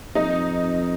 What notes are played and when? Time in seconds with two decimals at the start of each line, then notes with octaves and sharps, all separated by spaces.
0.15 F2 D#4